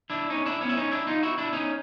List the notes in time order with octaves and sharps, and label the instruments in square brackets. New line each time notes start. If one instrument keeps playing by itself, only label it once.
[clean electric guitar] D4 E4
C#4 D#4
D4 E4
B3 C#4
E4
C#4 D#4
D4 E4
D#4 F4
E4 F#4
D4 E4
C#4 D#4